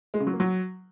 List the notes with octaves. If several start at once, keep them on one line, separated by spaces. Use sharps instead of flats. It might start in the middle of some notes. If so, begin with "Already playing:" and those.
G#3
C#3
F#3
A#3
F#3